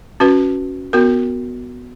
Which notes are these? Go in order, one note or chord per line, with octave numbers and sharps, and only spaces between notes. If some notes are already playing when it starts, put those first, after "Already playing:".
C#4 F#4 B4
B3 F#4 A#4